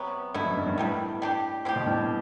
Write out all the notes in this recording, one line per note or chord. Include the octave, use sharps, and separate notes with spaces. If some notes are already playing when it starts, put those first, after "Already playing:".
Already playing: C3 F#3 B3
G2 B2 A3 E4
F#2
G2
G2
A2 C3 G3 B3
G3 D4 G4
A2 C4 E4 G4
B2
G2